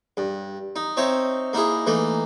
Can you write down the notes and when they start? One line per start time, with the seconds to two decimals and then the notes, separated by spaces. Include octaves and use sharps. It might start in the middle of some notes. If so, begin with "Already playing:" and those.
0.17 G2
0.76 D#4
0.97 C4 D#4 C#5 E5
1.53 A#3 D#4 E4 G#4
1.87 E3 A3 A#3 D#4